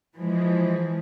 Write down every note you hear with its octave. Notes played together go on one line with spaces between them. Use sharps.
E3 F3 G#3